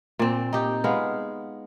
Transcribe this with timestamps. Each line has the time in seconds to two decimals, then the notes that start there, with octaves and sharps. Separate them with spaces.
0.19 A#2 C4
0.53 D#4 G4
0.84 G#3 B3 F5